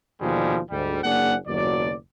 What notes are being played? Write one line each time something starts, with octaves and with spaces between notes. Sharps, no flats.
D#2 B2 D3 F3 G3 G#3
D2 G#2 G3
F#1 A#3 D4 G#4 F#5
F#1 D#2 B2 F#3 D5